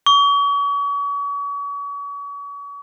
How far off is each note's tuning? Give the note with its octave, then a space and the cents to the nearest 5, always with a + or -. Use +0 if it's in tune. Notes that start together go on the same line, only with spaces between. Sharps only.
C#6 +40